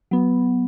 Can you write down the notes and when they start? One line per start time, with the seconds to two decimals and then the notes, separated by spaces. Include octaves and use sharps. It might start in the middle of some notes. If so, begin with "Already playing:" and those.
0.11 F#3 B3